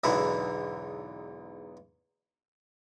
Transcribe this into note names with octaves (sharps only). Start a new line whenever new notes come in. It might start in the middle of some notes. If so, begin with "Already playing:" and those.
B1 E2 G#2 D3 E4